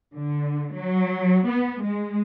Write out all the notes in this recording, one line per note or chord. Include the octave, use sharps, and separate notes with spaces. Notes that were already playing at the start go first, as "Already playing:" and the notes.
D3
F#3
B3
G#3